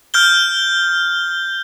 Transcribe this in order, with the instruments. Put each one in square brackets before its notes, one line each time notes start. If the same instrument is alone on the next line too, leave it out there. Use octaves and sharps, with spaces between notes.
[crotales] F6 G6 G7